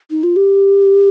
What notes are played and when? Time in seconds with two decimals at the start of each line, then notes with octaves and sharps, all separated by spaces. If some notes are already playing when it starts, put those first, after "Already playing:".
0.11 D#4
0.23 F4
0.36 G4